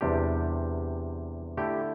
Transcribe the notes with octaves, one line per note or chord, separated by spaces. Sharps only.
E2 C3 G3 D4 G4
D3 A3 E4 G4